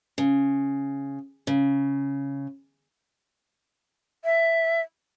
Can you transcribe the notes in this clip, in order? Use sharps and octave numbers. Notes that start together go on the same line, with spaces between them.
C#3
C#3
E5